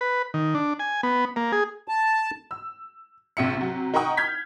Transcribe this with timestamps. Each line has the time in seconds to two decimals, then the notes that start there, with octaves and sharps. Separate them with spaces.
0.01 B4
0.34 D#3
0.55 D4
0.79 G#5
1.03 B3
1.36 A#3
1.52 G#4
1.88 A5
2.51 E6
3.37 A#1 C3 E5 C#7
3.57 C3 F#3
3.94 D#4 A#4 F#5 G5 C#6 D#6
4.17 F6 G6 G#6 B6